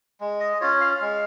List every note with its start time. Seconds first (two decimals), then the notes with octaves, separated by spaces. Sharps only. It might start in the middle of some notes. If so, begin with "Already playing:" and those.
0.21 G#3
0.40 D#5
0.61 C#4 F4 C#5
0.81 F5
1.01 G#3